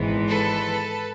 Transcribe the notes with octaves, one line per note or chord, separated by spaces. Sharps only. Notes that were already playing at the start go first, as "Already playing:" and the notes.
Already playing: G#1 G#2 E3 G#3 B3
A4 B4